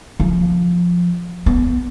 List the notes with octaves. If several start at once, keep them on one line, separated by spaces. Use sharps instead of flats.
F3
B3